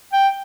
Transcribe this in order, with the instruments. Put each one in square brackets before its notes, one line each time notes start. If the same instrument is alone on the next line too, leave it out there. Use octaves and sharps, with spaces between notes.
[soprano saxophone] G5